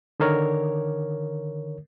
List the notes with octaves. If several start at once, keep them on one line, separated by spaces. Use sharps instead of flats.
D3 D#3 A#4 C#5